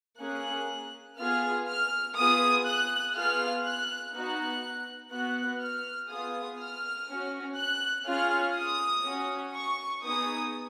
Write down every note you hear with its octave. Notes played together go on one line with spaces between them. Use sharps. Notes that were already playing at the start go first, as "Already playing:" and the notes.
A#3 C#4 G#4 F#6
B3 F4 G#4 F6
F6
B3 F4 G#4 D#6
F#6
B3 F4 G#4 F6
F#6
B3 D#4 F#4 F#6
B3 F#4 F#6
F6
B3 F4 G#4 D#6
F6
C#4 F#4
F#6
C#4 F4 G#4 F6
D#6
C#4 F#4
C#6
B3 D#4 G#4 D#6